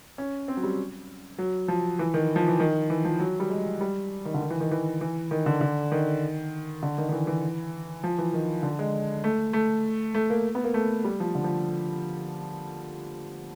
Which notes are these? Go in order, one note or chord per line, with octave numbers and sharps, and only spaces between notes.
C#4
C4
F#3
G3
F#3
F3
E3
D#3
F3
E3
D#3
E3
F3
F#3
G3
G#3
G3
D#3
D3
D#3
E3
D#3
E3
E3
D#3
D3
D3
D#3
D3
D#3
D#3
E3
E3
F3
E3
D#3
D3
G#3
A3
A3
A3
A#3
B3
A#3
A3
G3
F3
D3
F3